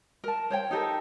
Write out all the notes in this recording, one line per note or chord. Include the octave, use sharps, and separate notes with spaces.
A#4 A5
C5 C#5 G5
D#4 G4 A4 A#4